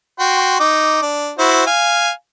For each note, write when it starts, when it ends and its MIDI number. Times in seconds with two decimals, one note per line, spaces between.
0.19 0.56 66
0.19 0.56 79
0.19 0.56 84
0.60 1.01 63
0.60 1.01 86
1.02 1.32 62
1.39 1.63 64
1.39 1.63 66
1.39 1.63 72
1.67 2.11 77
1.67 2.11 80